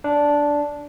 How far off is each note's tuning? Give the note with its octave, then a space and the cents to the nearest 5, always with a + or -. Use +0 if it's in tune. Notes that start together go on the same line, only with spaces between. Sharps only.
D4 -10